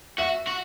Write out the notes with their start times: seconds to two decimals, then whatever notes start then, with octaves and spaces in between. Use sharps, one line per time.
0.18 F#4 E5
0.47 F#4